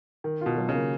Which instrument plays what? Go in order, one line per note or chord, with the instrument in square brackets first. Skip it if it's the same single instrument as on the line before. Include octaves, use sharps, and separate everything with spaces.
[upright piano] D#3
[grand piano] B2 [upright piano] F4
[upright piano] F#3
[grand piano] C#3
[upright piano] A#3